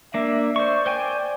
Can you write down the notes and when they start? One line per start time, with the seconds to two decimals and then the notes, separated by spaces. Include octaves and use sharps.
0.14 A#3 D4 E5
0.56 C5 D5 C#6
0.86 C5 G5 G#5